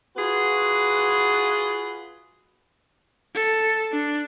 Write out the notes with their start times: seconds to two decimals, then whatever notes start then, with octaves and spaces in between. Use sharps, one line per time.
0.16 F4 F#4 G#4 B4
3.35 A4
3.92 D4